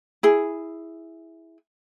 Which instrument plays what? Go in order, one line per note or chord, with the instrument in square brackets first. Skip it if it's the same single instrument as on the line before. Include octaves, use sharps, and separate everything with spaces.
[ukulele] E4 G#4